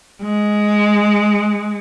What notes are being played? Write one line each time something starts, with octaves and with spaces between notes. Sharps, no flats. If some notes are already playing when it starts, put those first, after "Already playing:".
G#3